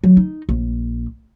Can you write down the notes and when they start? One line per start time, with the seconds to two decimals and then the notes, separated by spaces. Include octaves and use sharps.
0.04 F#3
0.17 D#4
0.49 A#1